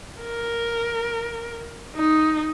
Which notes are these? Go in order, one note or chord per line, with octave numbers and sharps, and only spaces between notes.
A#4
D#4